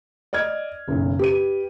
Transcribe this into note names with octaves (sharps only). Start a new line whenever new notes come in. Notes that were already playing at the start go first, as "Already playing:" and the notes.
D5 D#5 F6 G#6
F#1 B1
G4 B4 D#7